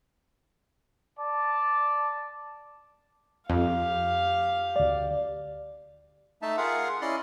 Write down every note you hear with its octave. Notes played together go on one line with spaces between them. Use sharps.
D5 A5
F2 G4 F5
D2 D5
A3 D#4 E5 A5
F4 G#4 A#4 F5 F#5
C#4 E4 D5 D#5 C6